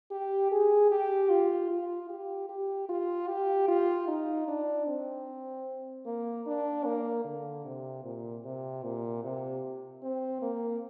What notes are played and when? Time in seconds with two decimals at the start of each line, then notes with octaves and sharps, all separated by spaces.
0.11 G4
0.51 G#4
0.91 G4
1.30 F4
1.70 F4
2.10 G4
2.49 G4
2.89 F4
3.28 G4
3.68 F4
4.07 D#4
4.48 D4
4.87 C4
6.06 A#3
6.46 D4
6.85 A#3
7.25 D3
7.64 C3
8.04 A#2
8.44 C3
8.83 A#2
9.24 C3
10.02 C4
10.42 A#3